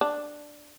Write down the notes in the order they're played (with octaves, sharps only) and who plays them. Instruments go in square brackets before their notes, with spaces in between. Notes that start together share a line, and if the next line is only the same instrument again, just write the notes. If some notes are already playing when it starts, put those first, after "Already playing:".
[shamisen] D4